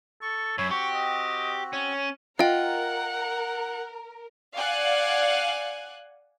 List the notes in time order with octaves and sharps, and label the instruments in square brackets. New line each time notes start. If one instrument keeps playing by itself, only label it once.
[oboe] A4 [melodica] C#6
[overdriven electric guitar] F#2 [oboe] C#5 [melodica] B5 E6
[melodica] C4 F#4 [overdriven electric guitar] G4 [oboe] C#6
[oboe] D#5
[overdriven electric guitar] C#4 [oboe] C#5
[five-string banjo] F4 [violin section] A#4 [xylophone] D#5 G5 [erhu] F#5
[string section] D5 F5 F#5 G#5 F#6